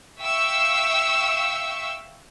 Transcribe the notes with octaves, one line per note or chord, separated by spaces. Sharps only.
E5 F5 G5 C#6 E6